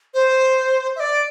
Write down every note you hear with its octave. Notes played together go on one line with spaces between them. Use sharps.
C5
E5
D5